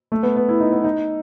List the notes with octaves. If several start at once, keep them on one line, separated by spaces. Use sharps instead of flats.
A3
B3
B3
E4
D#4
B3
D#4